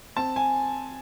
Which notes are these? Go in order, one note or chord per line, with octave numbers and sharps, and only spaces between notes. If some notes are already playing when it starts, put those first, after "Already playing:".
C4 A5
G#5